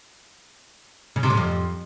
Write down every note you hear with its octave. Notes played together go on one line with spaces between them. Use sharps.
C#3
C3
A2
F2